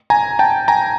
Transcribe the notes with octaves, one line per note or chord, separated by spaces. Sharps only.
G#5 A#5
G5 A5
G#5 A#5